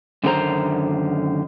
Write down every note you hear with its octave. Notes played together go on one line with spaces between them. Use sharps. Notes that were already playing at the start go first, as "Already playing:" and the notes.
F#2 D3 D#3 G4 C5 A#5